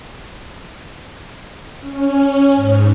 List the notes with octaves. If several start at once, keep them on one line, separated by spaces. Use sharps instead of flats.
C#4
G#2